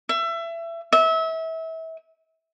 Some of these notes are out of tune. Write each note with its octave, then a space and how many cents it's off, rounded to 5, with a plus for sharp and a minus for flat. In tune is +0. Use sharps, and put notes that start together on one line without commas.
E5 +25
E5 -30